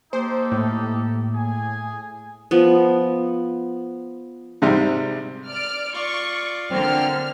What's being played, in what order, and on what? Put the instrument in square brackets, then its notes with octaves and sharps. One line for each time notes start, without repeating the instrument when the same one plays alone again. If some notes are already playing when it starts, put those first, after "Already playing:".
[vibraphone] A#3 [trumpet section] D#4 G4 A4 [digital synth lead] C5
[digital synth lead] A2
[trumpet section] G#4 G#5
[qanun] F3 B3
[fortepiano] G#2 C3 G3
[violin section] D5 F6 D7
[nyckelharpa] F4 D5 [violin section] C#6
[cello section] D3 A#3 [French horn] C4 [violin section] F6